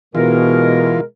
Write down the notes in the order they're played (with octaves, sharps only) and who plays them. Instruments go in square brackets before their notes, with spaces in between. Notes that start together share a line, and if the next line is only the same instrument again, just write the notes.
[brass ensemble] B2 [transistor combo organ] E3 F4 [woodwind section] G#3 A#4